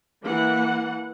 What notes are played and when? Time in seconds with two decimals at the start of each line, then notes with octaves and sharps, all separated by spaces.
0.22 E3 A#3 F#5